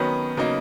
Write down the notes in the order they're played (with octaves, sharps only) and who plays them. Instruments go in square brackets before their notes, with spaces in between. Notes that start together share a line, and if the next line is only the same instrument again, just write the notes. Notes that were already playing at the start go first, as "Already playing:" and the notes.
Already playing: [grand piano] D#3 F#3 C#4 [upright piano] B3
[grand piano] C#3 F#3 A#3 D#4